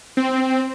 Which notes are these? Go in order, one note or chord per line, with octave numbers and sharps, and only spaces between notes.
C4